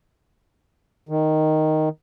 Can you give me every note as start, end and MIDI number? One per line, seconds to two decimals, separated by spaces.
1.09 1.89 51